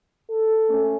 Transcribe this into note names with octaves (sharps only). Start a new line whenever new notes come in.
A4
A3 C#4